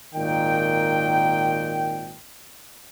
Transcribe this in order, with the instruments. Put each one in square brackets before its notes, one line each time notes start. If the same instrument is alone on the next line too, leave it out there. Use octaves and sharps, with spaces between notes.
[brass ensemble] G#1 A#2 D#3 G5